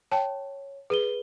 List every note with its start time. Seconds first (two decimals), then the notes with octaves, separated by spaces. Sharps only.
0.11 C#5 G5 A5
0.90 G#4 B4 D#7 G7